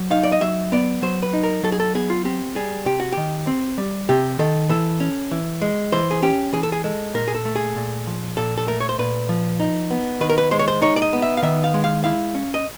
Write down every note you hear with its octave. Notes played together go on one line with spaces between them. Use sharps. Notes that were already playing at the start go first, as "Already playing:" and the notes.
Already playing: F#3
D#4 F5
D5
D#5
F#3 E5
B3 D5
F#3 C5
B4
D#4
A#4
F#3 A4
G#4
A4
B3 G#4
F4
C4 G4
G3 G#4
C3 G4
F#4
D#3 G4
C4
G3
C3 G4
D#3 A4
E3 A4
C#4
E3
G#3
E3 C5
G#4
C#4 G4
E3 G#4
A4
G#4
G#3 A4
A#2 A#4
G#4
A4
A3
G#4
A#2
F3
A#2 A4
A4
A3 A#4
C#5
C5
A#2 B4
F3
D#4
B3
D#3 B4
A#4
B4
G#3 C5
C#5
C5
D#4 C#5
D5
D#5
B3
E5
F5
D#3 E5
F5
G#3
F5
E4 F5
C#4
D#5